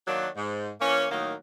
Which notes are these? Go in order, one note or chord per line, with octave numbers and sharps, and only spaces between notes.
D#3 F#3 A#3 D4
G#2
E3 A#3 C#4
A2 D#3 F#3 A#3 D#4